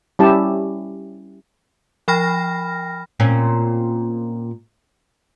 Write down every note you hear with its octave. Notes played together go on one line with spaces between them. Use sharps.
G3 C#4 E4 G4 A5
F3 G5 B5 F6 A#6
A#2 C4 C#4